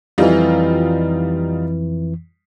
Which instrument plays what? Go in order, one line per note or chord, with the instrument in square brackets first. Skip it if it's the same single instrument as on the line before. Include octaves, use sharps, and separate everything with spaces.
[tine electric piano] F2 E3 [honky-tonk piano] G3 D#4 F4